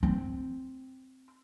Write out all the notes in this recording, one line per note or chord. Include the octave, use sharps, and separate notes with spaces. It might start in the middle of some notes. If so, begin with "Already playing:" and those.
C4